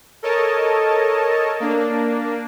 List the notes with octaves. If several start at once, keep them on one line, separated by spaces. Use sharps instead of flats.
A4 A#4 C#5 D#5 A5
A#3 D4